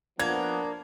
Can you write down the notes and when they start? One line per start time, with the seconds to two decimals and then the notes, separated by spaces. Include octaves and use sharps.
0.20 F3 A#3 B3 D4 G#6